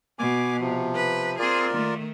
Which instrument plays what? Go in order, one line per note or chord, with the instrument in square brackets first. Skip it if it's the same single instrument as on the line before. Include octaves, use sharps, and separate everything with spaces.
[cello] B2 [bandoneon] G#5 D6
[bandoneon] C3 F3
[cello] B4
[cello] C4 G#4 [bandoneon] F4 A#4 D5
[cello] D#3 A3